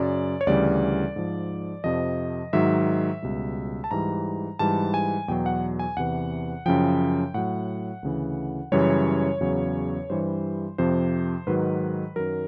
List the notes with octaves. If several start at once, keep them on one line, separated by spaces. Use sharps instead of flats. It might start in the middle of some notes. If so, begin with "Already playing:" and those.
Already playing: F#2 C#3 F#3 D5
C#5
D2 C#3 E3 G3 D5
G#2 F3
F2 C3 F3 D#5
G#2 D#3 F#3 E5
C#2 B2 G3
A5
G#2 E3 G3 A#5
G#2 E3 G3 A5
G#5
E2 B2 F#3 G5
F#5
G#5
E2 C3 E3 F#5
F#2 C#3 F3 G5
A2 F#3 F#5
D2 C#3 E3
F#2 C#3 E3 G3 C#5
E2 C#3 F#3
G2 E3 G3 C5
F2 C3 F3 C5
G#2 D#3 F#3 B4
F#2 D#3 F#3 A#4